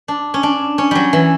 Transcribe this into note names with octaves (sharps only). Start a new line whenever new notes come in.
D4
C#4
D4
C#4
F#3 G3
E3